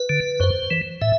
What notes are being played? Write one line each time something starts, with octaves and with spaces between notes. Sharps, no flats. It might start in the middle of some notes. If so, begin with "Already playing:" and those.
Already playing: B4
D3
F#2 C5
E3
A2 E5